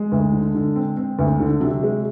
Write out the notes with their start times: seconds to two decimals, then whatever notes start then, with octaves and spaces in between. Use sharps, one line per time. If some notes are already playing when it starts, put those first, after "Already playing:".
Already playing: G#3
0.12 D2
0.32 D3
0.55 D3
0.76 C4
0.97 C4
1.19 D2
1.40 D3
1.61 C3 F#3
1.83 G#3